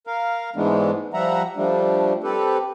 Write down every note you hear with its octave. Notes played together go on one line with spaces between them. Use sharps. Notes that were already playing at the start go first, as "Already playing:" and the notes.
A#4 F5
G#2 E3 G#3 A3 B3 D4
F3 G3 E5 F#5 A#5
F3 G3 A3 D4
C4 G4 A4 B4